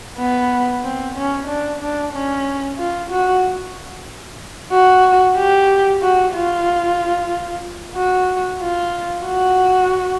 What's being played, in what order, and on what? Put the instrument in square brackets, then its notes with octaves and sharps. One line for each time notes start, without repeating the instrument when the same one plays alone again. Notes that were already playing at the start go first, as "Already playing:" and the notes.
[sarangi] B3
C4
C#4
D4
D4
C#4
F4
F#4
F#4
G4
F#4
F4
F#4
F4
F#4